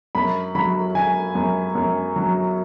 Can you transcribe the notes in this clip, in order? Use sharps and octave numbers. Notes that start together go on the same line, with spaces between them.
F#2 B5
F#3 B5
F#3 G#5
F#2
F#2
F#3